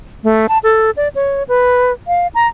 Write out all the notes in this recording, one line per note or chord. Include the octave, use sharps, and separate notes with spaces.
A3
A5
A4
D5
C#5
B4
F5
A#5